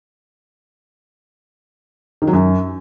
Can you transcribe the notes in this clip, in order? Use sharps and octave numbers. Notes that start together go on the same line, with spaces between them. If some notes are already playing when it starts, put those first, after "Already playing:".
D#3
F#3
F#2